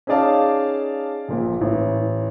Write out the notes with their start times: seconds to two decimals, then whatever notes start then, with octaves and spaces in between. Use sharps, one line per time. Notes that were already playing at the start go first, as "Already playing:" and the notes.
0.07 C#4 D#4 G#4 D5 F5 A5
1.29 A#1 A#2
1.61 A1